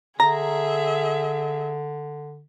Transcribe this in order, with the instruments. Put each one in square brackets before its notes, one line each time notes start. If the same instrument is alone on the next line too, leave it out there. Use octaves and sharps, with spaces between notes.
[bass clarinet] D3 [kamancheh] G#4 E5 [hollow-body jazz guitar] A#5